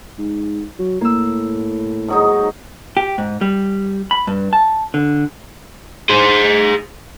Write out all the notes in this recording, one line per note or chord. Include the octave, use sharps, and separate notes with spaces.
G#2
F#3
A2 A#3 E6
G#2 F#3 D#4
G4
G#2
G3
B5
G2
A5
D3
G#4 C5